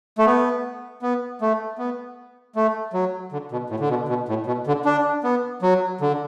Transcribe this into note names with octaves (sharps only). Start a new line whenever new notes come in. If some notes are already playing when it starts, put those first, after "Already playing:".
A3
B3
B3
A3
B3
A3
F#3
D3
B2
A2
D3
B2
B2
A2
B2
D3
D4
B3
F#3
D3